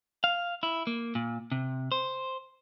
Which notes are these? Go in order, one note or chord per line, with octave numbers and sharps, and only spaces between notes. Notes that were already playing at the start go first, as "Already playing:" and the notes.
F5
E4
A#3
A#2
C3
C5